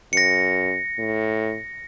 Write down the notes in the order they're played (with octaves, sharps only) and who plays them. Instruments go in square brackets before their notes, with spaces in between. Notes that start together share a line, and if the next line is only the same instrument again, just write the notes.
[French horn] F#2 [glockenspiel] A#6 C#7
[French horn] A2